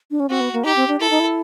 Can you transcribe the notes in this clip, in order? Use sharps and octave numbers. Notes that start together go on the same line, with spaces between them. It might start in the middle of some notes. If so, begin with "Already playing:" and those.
D4
C#4
C4 F#4
B3
A#3
D#4 G4
C4
D4
E4 A4
D#4
E4